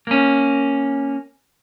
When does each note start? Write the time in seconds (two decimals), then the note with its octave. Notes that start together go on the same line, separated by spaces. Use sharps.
0.07 A#3 C#4